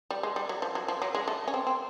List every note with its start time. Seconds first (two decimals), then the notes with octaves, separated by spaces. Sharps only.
0.11 G3
0.23 G#3
0.36 G3
0.49 F#3
0.62 F3
0.75 F#3
0.88 F3
1.02 F#3
1.15 G#3
1.28 A3
1.48 C#4
1.54 C4
1.67 C4